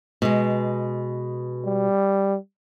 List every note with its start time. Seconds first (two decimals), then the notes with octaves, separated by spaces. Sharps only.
0.22 B2 G#3
1.65 G3